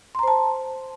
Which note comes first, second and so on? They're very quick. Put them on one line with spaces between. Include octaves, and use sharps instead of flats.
C6 A#5 C5 A5